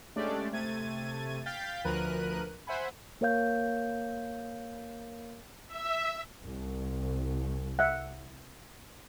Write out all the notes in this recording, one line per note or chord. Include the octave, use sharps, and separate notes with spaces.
G#3 A3 C#4 D4 G4 D5
C3 A3 G#6 A6 D#7
F5 G5 G6 A6 B6
D2 F3 A#4 B4 F#6 D#7
C5 E5 F#5 G#5 B5
A#3 A#4 C#5 F5 G6
E5
C2
E5 F#5